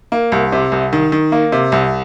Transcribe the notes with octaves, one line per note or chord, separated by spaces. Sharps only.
A#3
C2
C3
C2
D#3
D#3
A#3
C3
C2